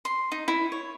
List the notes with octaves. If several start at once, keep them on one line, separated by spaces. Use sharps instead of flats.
C6
D#4
E4
C#5